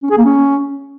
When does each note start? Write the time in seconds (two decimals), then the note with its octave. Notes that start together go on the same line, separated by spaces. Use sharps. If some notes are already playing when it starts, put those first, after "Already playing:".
0.03 C#4
0.10 G#4
0.18 A#3
0.25 C#4